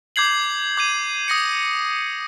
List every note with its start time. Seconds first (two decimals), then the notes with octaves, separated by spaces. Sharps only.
0.16 D6 G6 G#6 C7 F#7
0.77 D6 G6 D#7
1.28 D#6 A#6 C#7